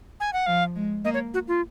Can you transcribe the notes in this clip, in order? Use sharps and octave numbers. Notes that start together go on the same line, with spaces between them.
G#5
F#5
F3 F5
G#3
A#3 D#5
C#5
F#4
F4